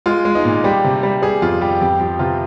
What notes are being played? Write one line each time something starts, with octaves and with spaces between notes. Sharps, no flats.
G#3 F4
G#3
D#4
A#2
G3 G4
C3
G3
G3 G#4
F2 F4
G3 G4
F2 G4
F3 G4
C3 F4